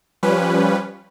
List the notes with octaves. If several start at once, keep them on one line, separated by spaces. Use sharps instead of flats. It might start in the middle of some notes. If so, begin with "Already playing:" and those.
F3 G3 C#4 B4